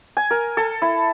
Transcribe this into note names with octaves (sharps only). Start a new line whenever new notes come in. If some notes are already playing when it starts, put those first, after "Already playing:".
G#5
A#4
A4
E4